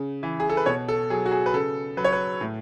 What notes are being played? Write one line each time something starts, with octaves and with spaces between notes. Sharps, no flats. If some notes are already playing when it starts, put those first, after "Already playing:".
Already playing: C#3
E3
G#4
A4
B4
B2 C#5
A4
F#3 G#4
F#4
G#4
B4
C#3 A4
F#3 B4
C#5
B4
A2